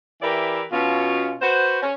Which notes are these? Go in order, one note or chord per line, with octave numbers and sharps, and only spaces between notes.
E3 G4 A#4 B4 D5 E5
B2 C#4 F4
F#4 B4 C5
C#4